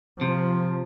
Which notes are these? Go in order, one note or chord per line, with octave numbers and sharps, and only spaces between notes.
C3 F3